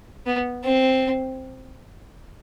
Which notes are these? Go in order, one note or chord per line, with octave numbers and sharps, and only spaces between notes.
B3
C4